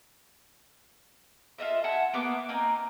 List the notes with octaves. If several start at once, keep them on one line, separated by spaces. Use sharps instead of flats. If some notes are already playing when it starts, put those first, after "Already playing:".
F4 A4 D#5 E5
E5 F#5 G#5 A5
A#3 B3 F#5 D6
A#3 C4 D#4 G#5